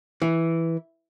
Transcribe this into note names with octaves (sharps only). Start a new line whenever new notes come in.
E3